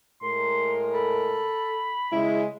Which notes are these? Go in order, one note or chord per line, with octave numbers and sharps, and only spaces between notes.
A2 G#3 A#4 C6
A4 B5
C#3 G#3 E4